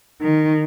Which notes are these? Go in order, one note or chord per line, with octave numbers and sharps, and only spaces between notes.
D#3